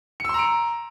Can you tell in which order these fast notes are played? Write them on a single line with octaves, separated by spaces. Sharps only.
C#7 E6 C6 A#5 D7